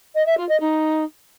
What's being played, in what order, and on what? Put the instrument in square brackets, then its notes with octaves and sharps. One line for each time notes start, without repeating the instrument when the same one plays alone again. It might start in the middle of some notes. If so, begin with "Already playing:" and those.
[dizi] D#5
E5
F4
D#5
D#4